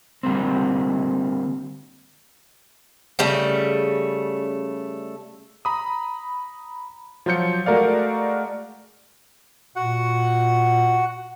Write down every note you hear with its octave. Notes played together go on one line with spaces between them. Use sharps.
D3 G3 A#3 C4
C#3 G3 A3
A#5 B5 D#6
F3 F#3 F4 G6 C#7
G#3 A3 F#4 A#4 D5 F5
A#2 F#4 F#5